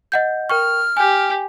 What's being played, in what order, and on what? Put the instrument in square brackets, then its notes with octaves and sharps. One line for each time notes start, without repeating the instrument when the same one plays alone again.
[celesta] D#5 F#5 G6
[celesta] A#4 G5 C#6 [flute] F6
[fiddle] G4 [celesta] G#5